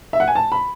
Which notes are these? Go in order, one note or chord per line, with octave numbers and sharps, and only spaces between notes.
E5
F#5
G#5
A5
B5